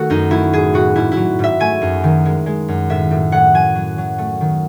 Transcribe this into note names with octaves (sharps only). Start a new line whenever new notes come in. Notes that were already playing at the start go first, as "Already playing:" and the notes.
Already playing: D#3 A3 F#4 A4
F#2 D#4
A3 E4
A2 G#4
A2 F#4
G#2 E4
E4
F#3
G#2 E5
A3 G#5
F#2
D#3
G#3
G#3
F#2
A2 E5
A2
A2 F#5
F#3 G#5
F#3
F#3
A3
D#3